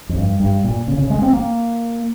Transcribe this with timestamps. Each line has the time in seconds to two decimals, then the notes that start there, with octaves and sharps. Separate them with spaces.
0.09 F2
0.17 G2
0.40 G2
0.64 A#2
0.88 C#3
0.98 C#3
1.10 G#3
1.22 C4
1.33 A#3